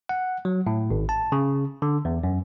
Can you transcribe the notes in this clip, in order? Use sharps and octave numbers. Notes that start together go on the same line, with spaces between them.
F#5
F#3
A2
G#1
A5
C#3
D3
E2
F#2